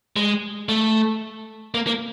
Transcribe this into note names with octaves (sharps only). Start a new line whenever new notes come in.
G#3
A3
A#3
A#3